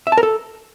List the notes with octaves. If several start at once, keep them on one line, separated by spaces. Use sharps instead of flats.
E5
A5
A#4
A4